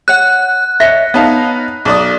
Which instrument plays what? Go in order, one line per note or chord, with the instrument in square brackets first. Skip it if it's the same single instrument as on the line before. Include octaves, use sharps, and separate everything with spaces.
[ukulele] C#5 F#5 [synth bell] F#6
[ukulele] C#5 D#5 E5 [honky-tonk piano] A#6 C#7
[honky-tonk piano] B3 D#4 F5 [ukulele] C#5 A5
[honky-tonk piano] B1 D5 D#6